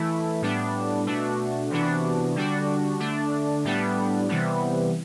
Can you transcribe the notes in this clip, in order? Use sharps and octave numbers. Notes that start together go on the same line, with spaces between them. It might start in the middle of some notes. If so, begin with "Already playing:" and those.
Already playing: E3 A3 E4
A2 G3 B3 D4
B2 A3 D4 F#4
C3 E3 B3 D4 F#4
D3 G3 D4 F#4
D3 A3 D4
A2 G3 B3 D4
C3 E3 G3 B3